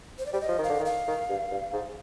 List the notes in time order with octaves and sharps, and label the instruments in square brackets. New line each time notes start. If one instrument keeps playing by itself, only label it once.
[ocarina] C5
D5
[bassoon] G3 [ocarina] C5
[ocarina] D#5
[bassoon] F3
D#3
[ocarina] F5
[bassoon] D3
D#3
[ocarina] F5
[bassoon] D#3
G2
G2
G#2